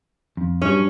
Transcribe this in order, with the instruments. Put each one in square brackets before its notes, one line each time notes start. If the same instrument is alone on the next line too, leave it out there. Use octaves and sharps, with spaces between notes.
[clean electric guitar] F2
[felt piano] G2 [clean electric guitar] F#3 [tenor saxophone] C#4 [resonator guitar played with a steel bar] C#5